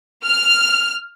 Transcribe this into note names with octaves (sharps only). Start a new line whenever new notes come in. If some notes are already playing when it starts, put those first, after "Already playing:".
F6